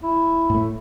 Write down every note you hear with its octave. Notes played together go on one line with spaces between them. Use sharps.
E4
A2 A3